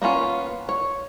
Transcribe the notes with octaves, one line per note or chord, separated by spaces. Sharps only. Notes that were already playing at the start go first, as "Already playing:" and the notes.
A#3 B3 C#4 F4
C#5